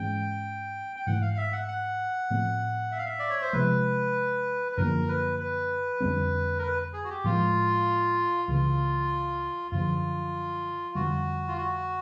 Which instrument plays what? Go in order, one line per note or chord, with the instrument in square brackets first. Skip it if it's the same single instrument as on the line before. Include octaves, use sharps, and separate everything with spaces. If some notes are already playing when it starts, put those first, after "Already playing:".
Already playing: [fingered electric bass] G#2 E3 G#3 C#4 [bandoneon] G5
[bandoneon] G5
[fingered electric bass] G#2 E3 A3 [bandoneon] F#5
[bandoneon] F5
E5
F#5
F#5
[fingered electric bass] A2 F3 A3 C4
[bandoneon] E5
F5
E5
D5
C#5
C5
[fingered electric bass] C3 F3 G#3 [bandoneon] B4
[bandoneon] B4
[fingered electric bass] F#2 D3 F3 A#3 [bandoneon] A#4
[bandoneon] B4
B4
[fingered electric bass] F2 D3 G3 C4
[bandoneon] A#4
B4
G#4
F#4
G4
[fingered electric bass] A2 F3 G#3 [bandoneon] F4
[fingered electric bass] C#2 C#3 E3 [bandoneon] F4
[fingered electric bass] F#2 D3 F3 [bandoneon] F4
[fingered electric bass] F2 D3 G3 [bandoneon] F#4
[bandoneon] F4
F#4